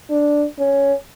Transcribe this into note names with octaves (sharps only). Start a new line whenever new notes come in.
D4
C#4